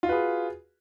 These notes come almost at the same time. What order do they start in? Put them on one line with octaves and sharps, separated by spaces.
F4 F#4 B4 G#4